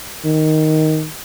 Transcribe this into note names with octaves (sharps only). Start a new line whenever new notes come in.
D#3